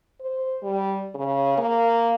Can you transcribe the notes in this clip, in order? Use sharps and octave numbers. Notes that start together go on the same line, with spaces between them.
C5
G3
C#3
A#3